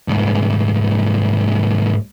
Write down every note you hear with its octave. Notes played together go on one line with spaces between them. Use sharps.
C2 G#2